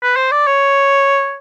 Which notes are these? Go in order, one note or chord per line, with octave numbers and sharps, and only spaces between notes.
B4
C5
D5
C#5